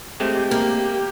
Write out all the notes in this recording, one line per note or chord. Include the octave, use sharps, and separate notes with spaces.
G#3 A3 C4 G4
A#3